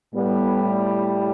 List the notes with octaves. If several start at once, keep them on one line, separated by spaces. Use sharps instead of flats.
A2 G3 B3